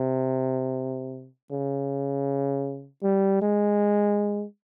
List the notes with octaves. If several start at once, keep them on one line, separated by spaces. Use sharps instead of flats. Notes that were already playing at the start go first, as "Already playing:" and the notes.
Already playing: C3
C#3
G3
G#3